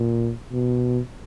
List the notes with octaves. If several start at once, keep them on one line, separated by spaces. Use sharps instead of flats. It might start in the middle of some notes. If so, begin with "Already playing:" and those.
Already playing: A#2
B2